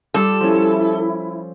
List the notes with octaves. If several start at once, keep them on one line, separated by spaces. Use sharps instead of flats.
G3 F4 A4
F3 C#4 E4